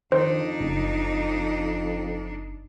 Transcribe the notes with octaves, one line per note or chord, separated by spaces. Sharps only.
F2 D#3 D4 D#4 C5
F#1